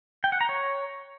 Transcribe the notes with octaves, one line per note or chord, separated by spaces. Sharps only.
G5
F#5
A#5
C#5